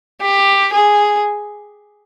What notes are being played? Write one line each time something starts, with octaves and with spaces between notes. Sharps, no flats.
G4
G#4